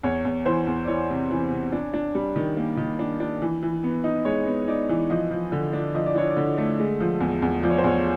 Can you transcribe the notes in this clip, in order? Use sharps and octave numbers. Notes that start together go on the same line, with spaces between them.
E2 C#5
E2
E3 C5
E2
D5
E3 C#5
C3
E3
C3
D4
D4
G3
D#3
A#3
D#3
D4
D4
E3
E3
B3
D#4
G#3 C#5
B3
D#4 D5
E3
F3 D#5
F3
D3
D4
F3 D#5
D5
D4 C#5
D5
D3
A3
G#3
F3
E2
E2
F3 D5
C#5
C5
E2 C#5